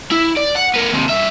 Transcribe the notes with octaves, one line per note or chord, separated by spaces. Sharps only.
E4
D5
F#5
B3 A#4
D#2 C3
G2 E5